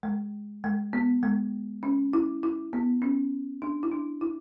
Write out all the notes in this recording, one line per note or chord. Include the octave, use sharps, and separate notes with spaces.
G#3
G#3
B3
G#3
C#4
E4
E4
B3
C#4
D4
E4
D4
E4